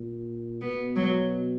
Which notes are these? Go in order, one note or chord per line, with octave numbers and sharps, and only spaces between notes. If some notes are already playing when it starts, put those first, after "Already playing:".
Already playing: A#2
B2 B3
F#3